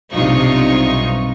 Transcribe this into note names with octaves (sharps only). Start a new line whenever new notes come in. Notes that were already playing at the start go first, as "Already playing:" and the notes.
B1 G2 C3 D#4 F4 C#6